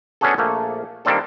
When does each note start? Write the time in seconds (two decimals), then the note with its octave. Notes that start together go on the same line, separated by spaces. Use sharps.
0.21 B3 C#4 D4 F#4 G#4 A4
0.38 A#1 A3 A#3
1.05 D#3 G3 A#3 C4 D4 A4